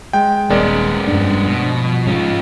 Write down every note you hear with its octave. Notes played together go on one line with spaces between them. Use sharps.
G#3 G5
D#1 G#3 B3 C#4 A#4 D5
F1 G2 D4
B2 F3
G#2 C#4 F4